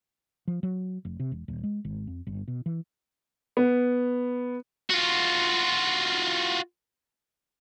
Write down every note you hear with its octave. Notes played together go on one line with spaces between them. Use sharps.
F3
F#3
F1
C3
E1
D#1
G#3
G#1
F2
G1
B2
E3
B3
F4 F#4